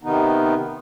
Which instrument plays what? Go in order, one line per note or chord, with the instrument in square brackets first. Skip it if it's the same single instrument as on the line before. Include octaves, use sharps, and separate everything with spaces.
[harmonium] C3 D#3 B3 D#4